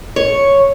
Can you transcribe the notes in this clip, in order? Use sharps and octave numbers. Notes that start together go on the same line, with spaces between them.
C#5